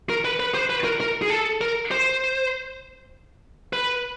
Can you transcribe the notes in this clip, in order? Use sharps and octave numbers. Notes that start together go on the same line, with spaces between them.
A#4
B4
B4
C5
B4
A#4
A#4
G#4
A4
A#4
C5
B4